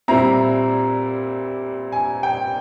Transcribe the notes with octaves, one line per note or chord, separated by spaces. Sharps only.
A#2 G3 C4 E4 A#5
G#5
G5